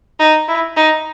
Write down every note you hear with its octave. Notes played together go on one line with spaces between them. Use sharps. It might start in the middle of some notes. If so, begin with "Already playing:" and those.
D#4
E4
D#4